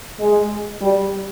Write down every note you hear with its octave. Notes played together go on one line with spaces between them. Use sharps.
G#3
G3